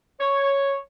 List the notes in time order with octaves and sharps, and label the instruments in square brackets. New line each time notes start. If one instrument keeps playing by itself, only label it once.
[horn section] C#5